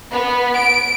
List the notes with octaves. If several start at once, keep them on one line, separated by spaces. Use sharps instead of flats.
B3
D7